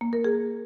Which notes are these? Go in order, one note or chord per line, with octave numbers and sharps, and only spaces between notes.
A#3
A#4
G#4